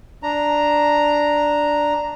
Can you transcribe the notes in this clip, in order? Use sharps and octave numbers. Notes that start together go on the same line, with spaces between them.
D4 A#5